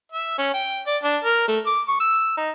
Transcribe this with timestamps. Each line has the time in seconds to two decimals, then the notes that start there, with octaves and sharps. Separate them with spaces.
0.12 E5
0.38 C#4
0.54 G5
0.87 D5
1.03 D4
1.24 A#4
1.48 A3
1.67 D6
1.88 C#6
2.00 E6
2.37 D#4